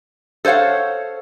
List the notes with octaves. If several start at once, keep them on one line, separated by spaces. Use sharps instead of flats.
A4 C5 C#5 F5 F#5